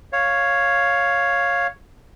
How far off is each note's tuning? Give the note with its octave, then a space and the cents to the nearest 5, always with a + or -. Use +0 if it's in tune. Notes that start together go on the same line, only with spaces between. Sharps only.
C#5 +0 F5 +5